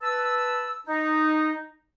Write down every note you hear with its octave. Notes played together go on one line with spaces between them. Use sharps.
B4 A5 E6
D#4